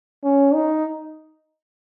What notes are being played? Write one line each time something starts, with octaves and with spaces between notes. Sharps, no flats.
C#4
D#4